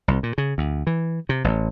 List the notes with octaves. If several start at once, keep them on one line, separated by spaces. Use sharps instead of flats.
C2
A#2
C#3
D2
E3
C3
A1